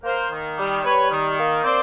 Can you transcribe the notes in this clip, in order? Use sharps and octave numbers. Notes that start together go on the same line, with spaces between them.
A#3 A#4 C5
D#3
G3
G3 B4 C#5
D#3
A#3
C4 C5 D5